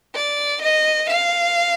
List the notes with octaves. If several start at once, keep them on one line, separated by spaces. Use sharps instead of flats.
D5
D#5
F5